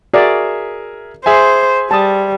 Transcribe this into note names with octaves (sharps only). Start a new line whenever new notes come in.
F#4 G#4 A#4 D5 E5
G#4 C5 E5 G#5
G3 A5 D#6